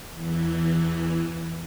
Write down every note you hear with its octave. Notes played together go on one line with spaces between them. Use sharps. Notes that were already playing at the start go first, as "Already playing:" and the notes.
E2 E3